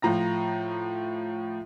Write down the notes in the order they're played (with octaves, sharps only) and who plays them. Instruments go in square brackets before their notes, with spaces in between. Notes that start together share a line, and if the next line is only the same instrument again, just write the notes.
[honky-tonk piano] A2 F3 A#5 A#6